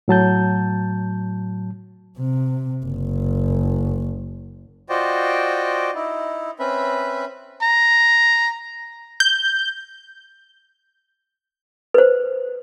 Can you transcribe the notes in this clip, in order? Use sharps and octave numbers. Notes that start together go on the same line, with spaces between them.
A2 F#3 A5 G6
C3
F#1
F4 F#4 C5 D5 D#5 G5
D#4 E4
C4 C#4 B4 E5 B5
A#5
G6
B4 C5